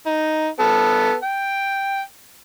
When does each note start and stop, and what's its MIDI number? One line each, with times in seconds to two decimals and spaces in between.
0.06 0.48 63
0.60 1.14 59
0.60 1.14 69
1.23 2.01 79